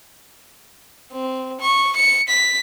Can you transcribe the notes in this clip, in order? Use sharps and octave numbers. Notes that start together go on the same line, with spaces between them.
C4
C#6
C#7
B6